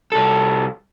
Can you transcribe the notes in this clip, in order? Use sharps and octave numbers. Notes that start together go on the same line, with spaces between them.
C2 A4